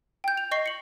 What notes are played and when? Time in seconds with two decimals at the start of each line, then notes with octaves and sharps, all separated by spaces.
0.24 G5 G6
0.37 F7
0.51 D#5 C#6 A#6 C7 G7
0.66 C#7 F#7